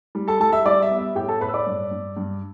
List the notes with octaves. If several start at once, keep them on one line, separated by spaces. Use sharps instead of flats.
G3
A4 A5
G3 A4 A5
E5 E6
G3 D5 D6
E5
B3
E5
A2 G4 G5
A4 A5
A2 B4 B5
E6
D5 D6
G2
G2
G2